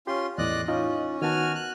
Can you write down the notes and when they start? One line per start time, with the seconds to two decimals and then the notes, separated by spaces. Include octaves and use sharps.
0.07 C#4 F4 G4 C6
0.38 E2 A2 D5 D#5 F#6
0.68 C#4 D#4 F4 D#5
1.22 D#3 B3 F#4 G#5 A5 F6
1.55 F#6